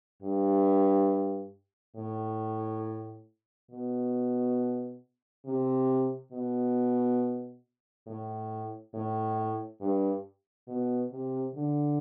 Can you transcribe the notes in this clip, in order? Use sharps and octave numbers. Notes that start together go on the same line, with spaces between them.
G2
A2
B2
C3
B2
A2
A2
G2
B2
C3
D3